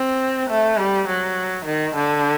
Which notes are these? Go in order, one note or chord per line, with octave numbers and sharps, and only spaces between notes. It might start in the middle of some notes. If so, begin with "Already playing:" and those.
Already playing: C4
A3
G3
F#3
D#3
D3